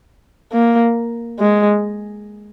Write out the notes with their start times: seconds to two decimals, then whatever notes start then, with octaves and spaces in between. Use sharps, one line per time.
0.52 A#3
1.39 G#3